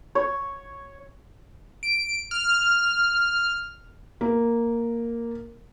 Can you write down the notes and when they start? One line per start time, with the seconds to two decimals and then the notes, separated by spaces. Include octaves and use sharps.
0.15 C#5
1.83 D7
2.31 F6
4.21 A#3